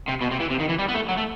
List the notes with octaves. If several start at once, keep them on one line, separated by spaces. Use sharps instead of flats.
C3
B2
C3
E3
C3
D#3
E3
G3
B3
A3
F#3
A3